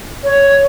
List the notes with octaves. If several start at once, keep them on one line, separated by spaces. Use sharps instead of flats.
C#5